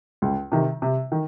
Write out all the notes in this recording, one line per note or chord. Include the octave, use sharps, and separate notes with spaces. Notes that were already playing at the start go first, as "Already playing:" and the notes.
C#2
C3 D#3
C3
D#3